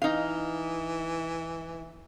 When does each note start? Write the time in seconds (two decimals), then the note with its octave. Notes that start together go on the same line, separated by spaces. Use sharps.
0.02 E3 D#4 F5